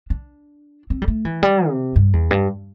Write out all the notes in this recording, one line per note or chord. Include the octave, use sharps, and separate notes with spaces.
D4
C4
G3
A3
E3
G3
C3
G2
E2
G2